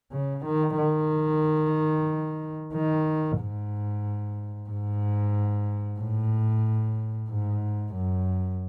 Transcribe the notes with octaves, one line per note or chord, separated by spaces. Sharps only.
C#3
D#3
D#3
D#3
G#2
G#2
A2
G#2
F#2